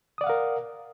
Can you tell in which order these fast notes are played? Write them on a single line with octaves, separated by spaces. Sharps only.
D#6 D5 F#5 F5 A#4